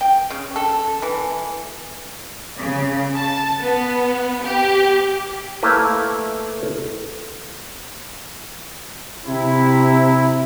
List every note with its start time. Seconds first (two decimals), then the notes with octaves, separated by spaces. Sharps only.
0.01 G5
0.30 C#3
0.56 A4
1.02 E3
2.59 C#3
3.18 A5
3.63 B3
4.46 G4
5.63 A3 A#3 E4 B4
9.26 C3 E4